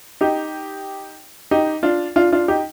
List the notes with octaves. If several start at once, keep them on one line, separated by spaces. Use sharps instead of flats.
D#4 G4
D#4 G4
D4 F4
D4 F4
D4 F4
D#4 G4